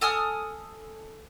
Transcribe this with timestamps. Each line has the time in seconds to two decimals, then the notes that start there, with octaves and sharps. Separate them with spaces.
0.01 A4 G#5 D#6 F6